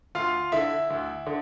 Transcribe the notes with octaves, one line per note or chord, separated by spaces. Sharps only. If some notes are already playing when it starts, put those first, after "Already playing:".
D2 F4 F5
D3 E4 E5
D2
D3